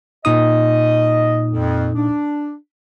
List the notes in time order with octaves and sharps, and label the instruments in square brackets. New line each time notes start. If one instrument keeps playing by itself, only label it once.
[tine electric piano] A#2 D#4 D#6 [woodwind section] D#5
[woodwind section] F2
D4